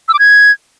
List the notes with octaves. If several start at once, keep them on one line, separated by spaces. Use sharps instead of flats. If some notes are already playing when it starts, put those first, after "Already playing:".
E6
D6
G#6